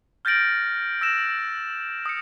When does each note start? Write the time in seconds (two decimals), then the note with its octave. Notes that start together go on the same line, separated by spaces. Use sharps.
0.25 F6 G6 A6 A#6 D7 F#7
1.01 E6 A#6 E7
2.06 D#6 C#7